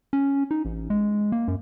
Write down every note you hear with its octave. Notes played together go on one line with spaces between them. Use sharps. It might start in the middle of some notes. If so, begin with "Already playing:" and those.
C#4
D#4
A1
G#3
A#3
F#2